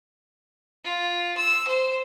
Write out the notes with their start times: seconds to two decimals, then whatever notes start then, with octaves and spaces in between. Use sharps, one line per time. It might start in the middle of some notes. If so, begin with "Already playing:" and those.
0.85 F4
1.37 E6
1.68 C5